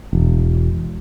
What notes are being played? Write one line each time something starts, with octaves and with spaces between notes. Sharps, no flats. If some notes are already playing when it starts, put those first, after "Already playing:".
E1